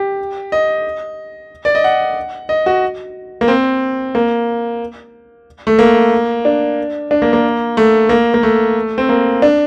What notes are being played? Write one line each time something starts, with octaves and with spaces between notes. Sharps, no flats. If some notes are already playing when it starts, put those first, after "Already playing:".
Already playing: G4
D#5
D5
D#5
F#5
D#5
F#4
A#3
C4
A#3
A3
A#3
D4
D4
A#3
A#3
A3
A#3
A#3
A3
C4
A#3
D4